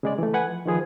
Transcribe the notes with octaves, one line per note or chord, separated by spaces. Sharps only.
C#3 G#3 D5
E3 A3
B4 F#5 G#5
F3
D#3 F3 G#4 B4